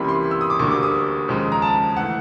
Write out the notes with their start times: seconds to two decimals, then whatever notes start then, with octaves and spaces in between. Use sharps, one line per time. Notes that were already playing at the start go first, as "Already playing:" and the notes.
Already playing: C#2 C3 E3 G3 A#3 B5
0.09 C6
0.31 E6
0.41 D#6
0.50 D6
0.59 D2 D3 G3 A#3 C#6
0.71 D6
0.83 D#6
1.28 D#2 C#3 F3 G#3
1.52 A#5
1.62 A5
1.97 E3 A3 F#5